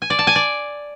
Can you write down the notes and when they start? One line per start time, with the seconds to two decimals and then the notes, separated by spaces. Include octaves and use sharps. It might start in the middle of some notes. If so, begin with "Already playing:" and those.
0.02 G#5
0.10 D5
0.19 A5
0.27 G#5
0.36 D5